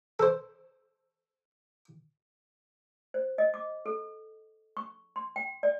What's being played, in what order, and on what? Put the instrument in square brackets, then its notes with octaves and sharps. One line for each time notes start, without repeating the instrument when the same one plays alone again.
[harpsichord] A4 C5
[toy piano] C5
D#5
D6
A4
C#6
C6
G5
D5